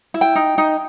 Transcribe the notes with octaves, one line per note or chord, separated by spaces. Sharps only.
E4
G5
D#4
D#4